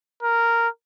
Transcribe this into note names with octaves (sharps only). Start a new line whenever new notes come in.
A#4